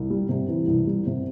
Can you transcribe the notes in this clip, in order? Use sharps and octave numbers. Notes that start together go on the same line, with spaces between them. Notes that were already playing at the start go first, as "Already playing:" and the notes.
Already playing: C2
G3
C3
E3
C2
G3
C3